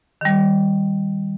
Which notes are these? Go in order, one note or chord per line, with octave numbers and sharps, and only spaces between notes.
D#3 G3